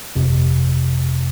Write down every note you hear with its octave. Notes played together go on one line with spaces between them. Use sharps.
G1 F2 C3